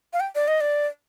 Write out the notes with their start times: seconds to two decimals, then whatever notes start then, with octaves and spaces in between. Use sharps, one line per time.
0.13 F5
0.20 G5
0.35 D5
0.47 D#5
0.60 D5